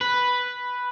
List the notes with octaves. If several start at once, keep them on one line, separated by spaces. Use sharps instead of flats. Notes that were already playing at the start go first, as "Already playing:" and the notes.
B4